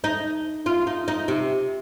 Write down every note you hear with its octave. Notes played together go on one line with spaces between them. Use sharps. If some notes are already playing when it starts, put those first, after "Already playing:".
D#4
F4
D#4
D#4
C3